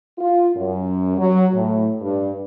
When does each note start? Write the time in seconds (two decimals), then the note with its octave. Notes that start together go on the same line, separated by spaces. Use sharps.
0.19 F4
0.56 F#2
1.18 F#3
1.53 A2
2.01 G2